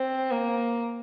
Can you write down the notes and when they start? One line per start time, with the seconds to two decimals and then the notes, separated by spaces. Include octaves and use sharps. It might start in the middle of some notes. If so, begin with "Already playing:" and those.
Already playing: C4
0.31 A#3